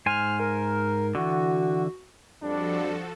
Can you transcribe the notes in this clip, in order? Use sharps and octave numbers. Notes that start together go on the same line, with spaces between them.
G#2 C5 G#5 F6
A#4
D3 E3 F#4
F2 F3 G3 D4 F#4 A4